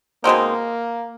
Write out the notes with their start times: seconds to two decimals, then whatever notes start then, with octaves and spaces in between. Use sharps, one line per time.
0.24 B2 G#3 A#3 C4 D#4